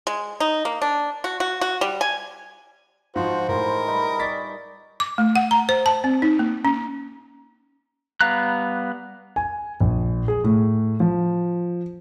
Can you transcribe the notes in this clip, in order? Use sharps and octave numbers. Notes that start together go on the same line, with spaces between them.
G#3
D#4
A#3
D4
F#4
F#4
F#4
G3
G#5
G#2 F3 F4 F#4 C5
A2 E3 G#3 D#4 A#4
G3 D#4 B5
D5 D#5 C#6 A6 B6
D6
A3
F#5
A#5
C5
A5
C4
D#4
A#3
C#4
G3 B3 F5 A#5 F#6
G#5
A#1
G#4
A2
F3